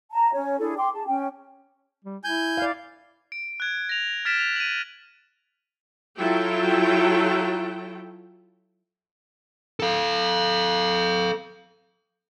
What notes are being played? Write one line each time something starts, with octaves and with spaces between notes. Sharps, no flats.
A5 A#5
C#4 C#5
D4 E4 G#4 A4
G5 C6 D6
G#4 A5
C#4 G5
G3
E4 G#5 G6
D5 F5
D7
F#6 G#6
A#6 F7
F6 A6 B6 D7 E7
F7
D#7 F#7
F#3 E4 F4 A4 G5
A4 F5